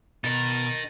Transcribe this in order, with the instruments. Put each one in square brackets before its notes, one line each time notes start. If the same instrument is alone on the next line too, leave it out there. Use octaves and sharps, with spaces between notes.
[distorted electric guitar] B2 [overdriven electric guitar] D#4 A#4 [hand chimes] A6